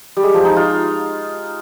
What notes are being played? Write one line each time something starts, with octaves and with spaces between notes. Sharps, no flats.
G3
G#3
F3
D#4
F4